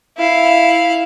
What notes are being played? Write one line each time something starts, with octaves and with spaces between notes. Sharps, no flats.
E4 F5